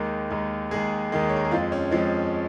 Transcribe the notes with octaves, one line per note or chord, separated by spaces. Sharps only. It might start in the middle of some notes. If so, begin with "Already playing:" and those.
Already playing: D#2 D#3 G#3
D#2 D#3 G#3
D#2 D#3 G#3 G#4
D#2 D#3 G#3
C#5
A#4
G#4
F2 F3 G#3 F4
C#4
F2 F3 G#3